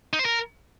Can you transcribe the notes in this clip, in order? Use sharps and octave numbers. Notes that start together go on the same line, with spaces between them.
D#4
C5
A#4